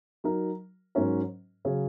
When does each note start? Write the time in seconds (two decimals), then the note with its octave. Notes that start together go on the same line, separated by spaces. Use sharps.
0.24 F#3 D#4 A#4
0.95 G#2 F#3 C#4 A#4
1.65 C#3 F#3 C#4 G#4